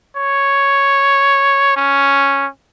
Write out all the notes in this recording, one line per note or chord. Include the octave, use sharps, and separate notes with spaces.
C#5
C#4